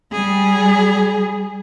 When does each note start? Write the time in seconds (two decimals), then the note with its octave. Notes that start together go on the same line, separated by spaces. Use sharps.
0.12 G3 G#4